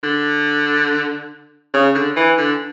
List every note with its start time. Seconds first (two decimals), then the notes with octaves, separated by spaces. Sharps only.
0.03 D3
1.74 C#3
1.95 D3
2.16 E3
2.38 D3